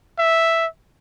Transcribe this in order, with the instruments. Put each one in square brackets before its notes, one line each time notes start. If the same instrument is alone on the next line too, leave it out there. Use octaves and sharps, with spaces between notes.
[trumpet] E5